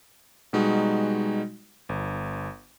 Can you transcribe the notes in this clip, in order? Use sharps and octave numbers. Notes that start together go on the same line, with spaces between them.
B2 G3 G#3 D#4 F#4
G1